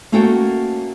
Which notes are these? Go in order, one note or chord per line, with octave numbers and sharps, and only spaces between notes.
A3 A#3 C#4 F#4 A4 G5